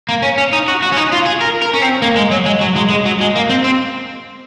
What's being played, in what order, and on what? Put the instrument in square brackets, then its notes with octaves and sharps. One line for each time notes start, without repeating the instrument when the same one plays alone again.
[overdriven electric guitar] A#3
C#4
C#4
D#4
F#4
F#4
C#4
D#4
F4
G#4
A#4
A#4
C#4
C4
A#3
G#3
F#3
G#3
F#3
G#3
G#3
F#3
G#3
A#3
C4
C4